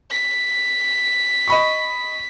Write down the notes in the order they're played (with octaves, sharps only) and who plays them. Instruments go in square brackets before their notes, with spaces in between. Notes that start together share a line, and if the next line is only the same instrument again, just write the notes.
[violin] B6
[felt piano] D#5 B5 C#6